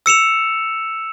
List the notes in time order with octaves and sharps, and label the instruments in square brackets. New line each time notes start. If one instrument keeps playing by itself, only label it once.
[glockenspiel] E6 C#7 E7 F7